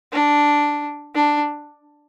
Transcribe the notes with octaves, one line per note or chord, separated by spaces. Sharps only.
D4
D4